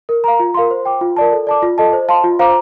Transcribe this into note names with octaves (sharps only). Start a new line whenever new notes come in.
A#4
F5 A#5
F4
A#4 F5 C6
C5
G5 D6
F4
A#4 D5 A5
A4
D5 A5 D6
F4
A4 D#5 A5
C5
F5 A5 C6
F4
C5 F5 A#5 D6